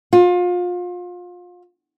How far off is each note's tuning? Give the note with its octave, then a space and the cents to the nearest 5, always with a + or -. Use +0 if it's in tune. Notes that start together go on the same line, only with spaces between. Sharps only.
F4 +30